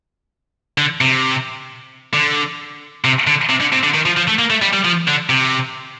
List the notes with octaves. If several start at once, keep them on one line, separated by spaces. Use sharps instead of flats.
D3
C3
D3
C3
D3
C3
D3
C3
D3
D#3
F3
F3
A3
A#3
A3
G3
G3
F3
D3
C3